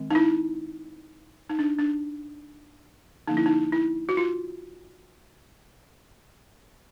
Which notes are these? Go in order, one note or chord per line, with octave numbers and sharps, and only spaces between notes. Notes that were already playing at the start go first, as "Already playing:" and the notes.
Already playing: D#3 G#3 C4
D#4
E4
D#4
D4
D4
D3 F3 A#3 C#4 D#4
E4
D#4
E4
F#4
F4